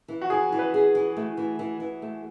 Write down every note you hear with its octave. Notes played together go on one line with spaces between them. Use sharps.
E3
F#4
E3 G#4
E3
B4
G#4
E3
A3
E3
E3
E3
A3